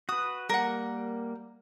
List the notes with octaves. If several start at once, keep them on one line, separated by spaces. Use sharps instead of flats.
F#4 B4 D#6
G3 A#3 A#4 F#5